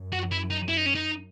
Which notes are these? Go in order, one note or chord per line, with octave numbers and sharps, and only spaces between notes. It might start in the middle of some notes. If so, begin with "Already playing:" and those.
Already playing: F#2
F#4
E4
D#4
E4
D#4
C#4
D#4